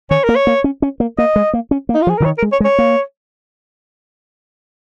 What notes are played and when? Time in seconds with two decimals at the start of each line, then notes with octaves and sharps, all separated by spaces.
0.11 D#3 C#5
0.23 A#4
0.29 A#3
0.36 C#5
0.47 A#3
0.64 C#4
0.82 C#4
1.00 A#3
1.18 A#3 D#5
1.36 G#3
1.53 A#3
1.71 C#4
1.89 A#3
1.94 D#4
2.02 F4
2.07 F3
2.10 G#4
2.18 C#3 A#4
2.25 D#3 C#5
2.38 A#4
2.42 G#3
2.52 C#5
2.60 G#3
2.65 C#5
2.79 A#3